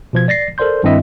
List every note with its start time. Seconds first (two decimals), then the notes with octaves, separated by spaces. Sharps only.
0.13 B2 F3 G#6
0.28 D5 A6 A#6 C7
0.58 A4 A#4 C5 D5 C6 G6
0.83 G2 D#3 C4 E4 D#5 E5